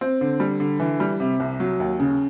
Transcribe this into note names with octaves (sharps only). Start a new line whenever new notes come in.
C4
D3
G3
D3
E3
G3
C3
C2
F#3
D#2
C#3